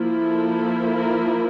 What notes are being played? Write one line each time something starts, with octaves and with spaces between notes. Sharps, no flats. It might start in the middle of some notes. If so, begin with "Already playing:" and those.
Already playing: F3 A#3 E4
A4
A#4